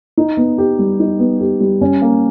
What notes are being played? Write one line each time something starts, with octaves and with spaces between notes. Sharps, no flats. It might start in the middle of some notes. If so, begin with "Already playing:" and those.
D#4
B3
G4
G3
D#4
B3
G4
G3
C#4
A#3